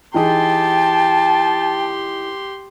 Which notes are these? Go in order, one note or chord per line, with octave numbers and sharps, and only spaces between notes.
E3 D#4 G4 G#4 G5 A5 C6